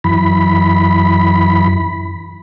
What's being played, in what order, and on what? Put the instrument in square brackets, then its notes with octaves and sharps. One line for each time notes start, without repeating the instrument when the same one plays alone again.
[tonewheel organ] F#2 E3 B5